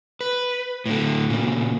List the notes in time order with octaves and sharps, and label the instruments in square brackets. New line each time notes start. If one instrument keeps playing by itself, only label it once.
[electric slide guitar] B4
A2 D3
[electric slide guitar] A#2 C#3 [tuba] A#3